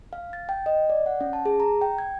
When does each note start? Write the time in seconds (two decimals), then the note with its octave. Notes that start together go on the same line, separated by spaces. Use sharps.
0.13 F5
0.33 A6
0.49 G5
0.66 D#5
0.90 D5
1.06 F#5
1.21 C#4
1.33 A5
1.46 G#4
1.60 A#5
1.81 G5
1.98 G#6